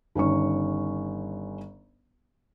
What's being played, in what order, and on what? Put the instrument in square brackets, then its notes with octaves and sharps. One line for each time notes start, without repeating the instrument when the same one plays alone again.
[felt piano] G1 D#3 C#4 C#6